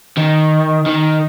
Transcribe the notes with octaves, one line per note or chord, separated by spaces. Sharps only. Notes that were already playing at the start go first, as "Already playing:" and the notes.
D#3
D#3